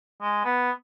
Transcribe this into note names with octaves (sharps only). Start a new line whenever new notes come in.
G#3
B3